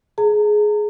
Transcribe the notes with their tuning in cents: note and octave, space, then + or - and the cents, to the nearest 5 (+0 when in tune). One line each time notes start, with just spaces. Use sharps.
G#4 +15 A#5 -35